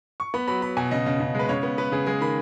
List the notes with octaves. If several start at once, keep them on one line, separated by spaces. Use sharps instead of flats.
C#6
B3 B5
F#3 B5
F#3 B5
B2 G#5
C#3 D#5
C#3
C#3
G#3 B4
C#3 C#5
B3
B3 B4
C#3 G#4
G#3 G#4
D#3 B5